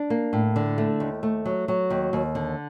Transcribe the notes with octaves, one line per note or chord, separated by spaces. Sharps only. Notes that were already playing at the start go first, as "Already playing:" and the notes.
Already playing: D4
A#3
A2
D3
A3
D#2
A3
F#3
F#3
D#2
D#2
D3